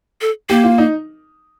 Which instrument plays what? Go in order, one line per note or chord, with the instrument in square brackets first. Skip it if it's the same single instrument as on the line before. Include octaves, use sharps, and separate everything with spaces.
[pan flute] A4
[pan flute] A#3 [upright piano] G4
[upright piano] F4
D#4